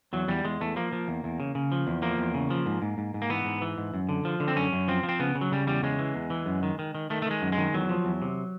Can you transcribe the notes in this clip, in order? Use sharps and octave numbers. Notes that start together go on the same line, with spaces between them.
E2 F#3
E2 G3
E2 G#3
E2 A3
F3 A#3
F3
E2
E2
C#3
C#3
F3
E2
F3 A#3
E2
C#3
F3
G#2
G#2
G#2
G#2
A#3
E3 B3
G#2
E3
G#2
F#2
D3
F3
D3
C4
F#2 C#4
F#2
F3 C4
F3
C4
C#3 B3
C#3
F#3
C#3 G3
E2 G3
C#3 G#3
E3
E2
E3
F#2
D#3
D#3
D#3
D#3 A3
A3
D#3 G#3
F#2
G#3
D#3
E2 F#3
F3
E2
C3